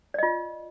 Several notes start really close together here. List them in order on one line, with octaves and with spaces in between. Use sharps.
D5 D#5 F4